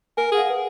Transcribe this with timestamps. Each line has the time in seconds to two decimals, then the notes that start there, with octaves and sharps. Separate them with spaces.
0.17 A#4 G#5
0.32 G#4 F#5
0.38 F5
0.50 B4